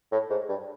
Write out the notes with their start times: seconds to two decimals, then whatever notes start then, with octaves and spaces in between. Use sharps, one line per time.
0.12 A2
0.30 G#2
0.49 G2